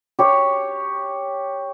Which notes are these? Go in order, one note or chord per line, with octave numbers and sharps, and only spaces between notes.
G4 C#5